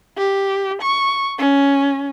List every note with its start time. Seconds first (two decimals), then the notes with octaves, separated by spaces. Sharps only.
0.17 G4
0.82 C#6
1.39 C#4